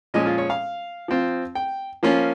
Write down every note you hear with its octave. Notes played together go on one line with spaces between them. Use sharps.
A#2 F3 G#3 C#4 D#5
F4
C#5
F5
F3 C4 F4
G5
F3 A#3 C#4 F4